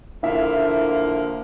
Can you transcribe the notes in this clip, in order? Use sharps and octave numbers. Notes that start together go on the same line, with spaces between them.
D3 F3 A#3 E4 E5 F5